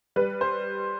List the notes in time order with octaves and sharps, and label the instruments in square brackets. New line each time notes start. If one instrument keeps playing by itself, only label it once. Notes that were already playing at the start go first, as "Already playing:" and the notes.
[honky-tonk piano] G3 B4
C5